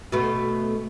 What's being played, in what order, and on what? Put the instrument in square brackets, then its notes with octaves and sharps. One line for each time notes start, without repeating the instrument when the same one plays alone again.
[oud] B2 A3 B3